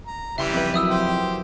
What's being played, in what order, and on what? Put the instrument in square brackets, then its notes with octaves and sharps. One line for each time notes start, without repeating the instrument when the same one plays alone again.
[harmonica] A#5
[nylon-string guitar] C#3 [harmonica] E3 G3 G4 [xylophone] E5 C6
[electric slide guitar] F2 B4
[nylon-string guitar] F#3 A#3 E4 [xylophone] E5 D#6 E6
[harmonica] G4 C5